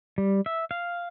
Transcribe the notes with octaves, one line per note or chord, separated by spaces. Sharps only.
G3
E5
F5